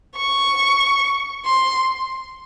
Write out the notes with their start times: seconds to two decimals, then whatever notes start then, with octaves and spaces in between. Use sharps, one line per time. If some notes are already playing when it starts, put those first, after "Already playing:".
0.16 C#6
1.45 C6